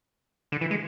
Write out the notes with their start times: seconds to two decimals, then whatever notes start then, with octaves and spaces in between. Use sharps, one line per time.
0.52 D3
0.61 E3
0.71 G#3